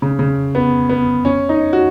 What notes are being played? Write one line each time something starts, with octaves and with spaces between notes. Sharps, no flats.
C#3
C#3
B3
B3
C#4
D#4
F#4